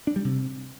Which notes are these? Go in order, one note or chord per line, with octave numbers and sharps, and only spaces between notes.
D4
G3
C3